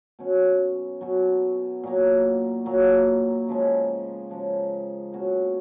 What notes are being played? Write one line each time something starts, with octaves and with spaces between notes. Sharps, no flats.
B2 F#3 C#4 F#4
B2 F#3 C#4 F#4
A#2 F#3 A#3
A#2 F#3 A#3
C#3 F3 G#3
C#3 F3 G#3
B2 A#3 C#4 F#4